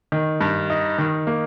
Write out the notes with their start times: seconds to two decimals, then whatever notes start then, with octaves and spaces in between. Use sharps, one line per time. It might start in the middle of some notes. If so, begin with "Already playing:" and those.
0.12 D#3
0.41 G2
0.70 D#4
0.98 D#3
1.27 A#3